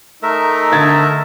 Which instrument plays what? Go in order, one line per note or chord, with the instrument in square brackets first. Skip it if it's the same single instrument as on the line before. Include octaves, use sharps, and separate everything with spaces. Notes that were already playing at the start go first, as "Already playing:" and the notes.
[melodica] A3 A#4 E5 [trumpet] D#4
[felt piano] D3 G#6 A6